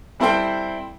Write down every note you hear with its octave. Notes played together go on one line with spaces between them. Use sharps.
G3 C4 E4 A4 C5 G5